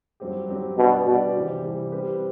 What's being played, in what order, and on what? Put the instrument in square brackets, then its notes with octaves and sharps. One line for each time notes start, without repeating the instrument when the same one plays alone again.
[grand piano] G2 F#3 C4 G4
G2 F#3 C4 G4
[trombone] B2 [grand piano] G3 D4 G4 D5
[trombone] B2 [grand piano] G3 D4 G4 D5
[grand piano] C3 E3 G3 C4 G4
C3 E3 G3 C4 G4
G3 C4 G4 B4